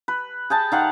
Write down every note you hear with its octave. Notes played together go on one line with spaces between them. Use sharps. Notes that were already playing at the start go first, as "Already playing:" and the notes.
B4
G#4 G5 A5
D#3 F5 F#5